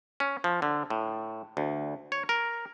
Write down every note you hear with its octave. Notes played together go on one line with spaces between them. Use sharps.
C#4
F3
D3
A2
D2
C#5
A#4